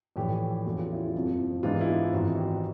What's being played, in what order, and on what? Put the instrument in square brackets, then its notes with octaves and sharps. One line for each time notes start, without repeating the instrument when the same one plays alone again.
[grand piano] A#1 A2 E3 G4
E2 C#3 E3 A3 C#4 F#4
F4
E4
F4
F#1 F2 C3 F3
G#2 E3 G#3 B3 D4 F4
E4
F4
G#1 G#2 E3 F#4
G4
G4